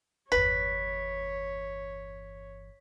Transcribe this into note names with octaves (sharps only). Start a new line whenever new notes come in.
G1 E2 B4 C#5 B6